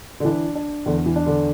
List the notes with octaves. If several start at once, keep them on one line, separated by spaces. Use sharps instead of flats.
D3
E3 D4
D4
E2 D3
E3
D4
D3